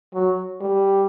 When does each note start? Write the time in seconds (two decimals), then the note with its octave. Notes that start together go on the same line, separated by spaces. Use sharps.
0.14 F#3
0.61 G3